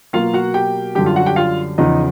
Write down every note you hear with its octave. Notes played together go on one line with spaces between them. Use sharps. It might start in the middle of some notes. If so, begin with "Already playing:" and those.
B2 F#3 A#3 F4 F5
F#4 F#5
G4 G5
F#2 D3 G3 G4 G5
F4 F5
F#4 F#5
G4 G5
F4 F5
E2 C#3 F3 D#4 D#5